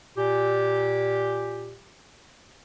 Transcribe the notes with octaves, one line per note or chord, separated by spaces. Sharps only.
A#2 G4